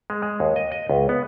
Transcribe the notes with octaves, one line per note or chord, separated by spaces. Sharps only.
G#3
G#3
D#2
D#5
D#5
C#2
B3